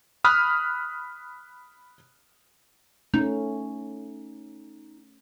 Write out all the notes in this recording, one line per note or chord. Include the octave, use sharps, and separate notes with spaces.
B5 D#6 F6 F#6
A3 C#4 D#4